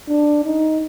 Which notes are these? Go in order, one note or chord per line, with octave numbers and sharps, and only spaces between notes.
D4
D#4